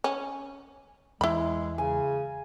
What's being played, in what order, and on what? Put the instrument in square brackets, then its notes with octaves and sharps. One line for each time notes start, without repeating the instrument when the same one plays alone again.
[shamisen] C#4
[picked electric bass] E2 [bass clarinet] G#3 [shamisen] E4 B5
[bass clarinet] C#3 [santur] G#5